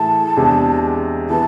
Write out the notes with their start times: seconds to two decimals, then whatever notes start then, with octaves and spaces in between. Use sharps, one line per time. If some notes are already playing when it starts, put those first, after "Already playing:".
Already playing: A2 E3 A3 E4 G#4 A5
0.36 E2 C3 G#3 D4 G#4
1.29 E3 B3 E4 A5